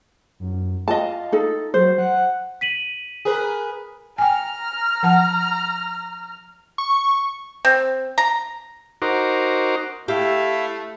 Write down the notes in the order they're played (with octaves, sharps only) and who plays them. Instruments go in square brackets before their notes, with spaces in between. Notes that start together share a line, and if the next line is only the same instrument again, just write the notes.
[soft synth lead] F#2
[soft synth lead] F4 [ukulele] D#5 A5
[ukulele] D#4 A4
[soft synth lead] F#3 [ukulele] C5
[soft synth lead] F#5
[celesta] B6 D#7 F#7
[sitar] G#4 A#4 B4
[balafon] G5 G#5 [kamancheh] A#5 F6
[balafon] F3 F#5 A5
[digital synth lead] C#6
[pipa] C4
A#5
[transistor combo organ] D#4 F#4 A#4 C5 D6
[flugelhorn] A3 [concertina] E4 E5 F5 [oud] G4